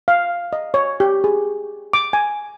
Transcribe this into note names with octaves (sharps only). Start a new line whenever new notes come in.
F5
D#5
C#5
G4
G#4
D6
G#5